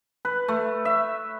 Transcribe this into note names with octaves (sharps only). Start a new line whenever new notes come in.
B4
A3
E5